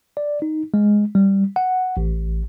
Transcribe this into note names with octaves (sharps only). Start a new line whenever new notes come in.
D5
D#4
G#3
G3
F#5
A1